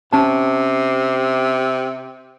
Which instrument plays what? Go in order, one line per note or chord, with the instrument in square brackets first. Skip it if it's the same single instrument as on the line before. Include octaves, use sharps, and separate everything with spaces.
[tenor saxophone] C3 [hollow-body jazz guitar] C#4 A5